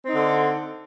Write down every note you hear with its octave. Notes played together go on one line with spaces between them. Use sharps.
D3 C4 D#4